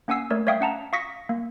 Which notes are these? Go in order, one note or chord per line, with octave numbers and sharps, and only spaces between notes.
A#3 C#4 F#5 G#5 E6 C7
A3 A#4 C#5 D5
C#5 D5 E5 F5 G5 D#6
C#4 F#5 A5 A#5
F5 C#6 D#6 A#6 B6 C#7
A#3